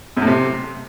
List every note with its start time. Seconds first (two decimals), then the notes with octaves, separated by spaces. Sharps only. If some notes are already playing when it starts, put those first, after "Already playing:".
0.17 F#2
0.22 A2
0.27 C3